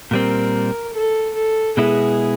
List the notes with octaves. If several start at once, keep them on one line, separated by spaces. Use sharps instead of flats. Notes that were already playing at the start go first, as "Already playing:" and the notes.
A#2 G3 C4 A#4
A4
A4
B2 G#3 B3 E4 G#4